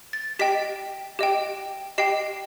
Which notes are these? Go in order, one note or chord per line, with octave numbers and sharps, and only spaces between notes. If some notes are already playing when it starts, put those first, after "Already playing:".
A6
G4 D#5 G5 B6
G4 D#5 G5
G4 D#5 G5 C7